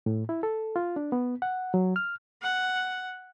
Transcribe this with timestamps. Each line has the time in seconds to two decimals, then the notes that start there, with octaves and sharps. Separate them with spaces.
0.06 A2
0.29 E4
0.43 A4
0.76 F4
0.96 D4
1.12 B3
1.42 F#5
1.74 F#3
1.96 F6
2.42 F#5